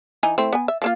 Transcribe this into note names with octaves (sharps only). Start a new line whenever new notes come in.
E3 D#4 G#5
A3 C4 E4
B3 G#5
E5
F3 A#3 F4